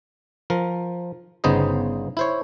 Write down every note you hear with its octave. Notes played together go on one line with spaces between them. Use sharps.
F3 A#4
G1 C#3 B3 D#4 C5 D#5
E4 C5 C#5